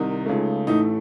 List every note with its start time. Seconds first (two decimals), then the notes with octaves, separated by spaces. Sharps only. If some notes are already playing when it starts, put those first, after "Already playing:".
Already playing: C2 C3 D#3 D#4
0.26 C#2 C#3 A3
0.67 A1 A2 A3 D#4